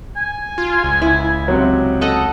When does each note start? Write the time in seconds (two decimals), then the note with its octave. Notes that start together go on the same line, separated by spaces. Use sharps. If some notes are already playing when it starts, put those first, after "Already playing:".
0.16 G#5
0.58 F4
0.84 C#2
1.02 E4
1.48 C3 F#3
2.01 A4 D#5 F#5